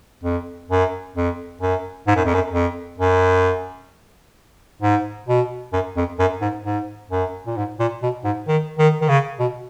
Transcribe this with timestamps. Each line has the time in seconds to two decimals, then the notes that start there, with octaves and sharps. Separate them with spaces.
0.24 F2
0.70 F#2
1.16 F2
1.61 F#2
2.07 G#2
2.16 F#2
2.25 F2
2.34 F#2
2.53 F2
2.98 F#2
4.82 G#2
5.28 B2
5.73 F#2
5.97 F2
6.19 F#2
6.41 G#2
6.65 G#2
7.11 F#2
7.47 A#2
7.57 G#2
7.80 A#2
8.02 B2
8.24 G#2
8.48 D#3
8.79 D#3
9.01 D#3
9.09 C#3
9.40 B2